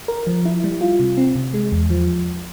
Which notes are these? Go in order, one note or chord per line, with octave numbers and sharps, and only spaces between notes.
A#4
F3
E4
G3
F4
C3
C4
C3
G#3
E2
F3